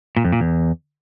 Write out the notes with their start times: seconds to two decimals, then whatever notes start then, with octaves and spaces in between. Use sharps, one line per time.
0.17 A#2
0.24 F2
0.32 A#2
0.40 E2